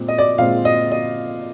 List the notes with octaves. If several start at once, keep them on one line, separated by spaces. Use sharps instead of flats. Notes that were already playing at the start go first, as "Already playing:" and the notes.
Already playing: A#2 G#3 C4
D#5
D5
A#2 G#3 C4 F5
D#5
D#5